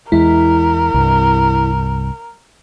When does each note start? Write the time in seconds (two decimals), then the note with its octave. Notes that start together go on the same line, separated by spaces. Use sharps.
0.12 E2 G#3 E4 A#4
0.94 C2 G2